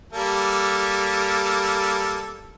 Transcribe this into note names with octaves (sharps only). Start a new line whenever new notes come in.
G3 A#3 A4